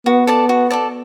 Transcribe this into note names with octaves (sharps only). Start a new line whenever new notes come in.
B3 F#4
A4 D5 A5
F#4
A4 D5 A5